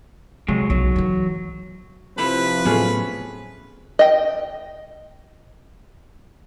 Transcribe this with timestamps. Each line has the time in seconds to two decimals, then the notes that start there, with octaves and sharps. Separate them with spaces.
0.48 C3 F#3 G#3
0.70 B1 F#3
0.96 D#3 E3
2.18 C3 F3 C4 E4 B4 C5 B5
2.65 A2 F#3 B3 C#4 G#4 A4
3.99 D#5 G5